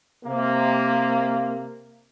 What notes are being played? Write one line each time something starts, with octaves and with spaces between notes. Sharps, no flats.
C3 A#3